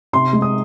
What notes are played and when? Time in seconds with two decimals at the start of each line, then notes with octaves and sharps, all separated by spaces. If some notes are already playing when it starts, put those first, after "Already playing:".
0.13 C3 C6
0.33 G#3
0.42 D#6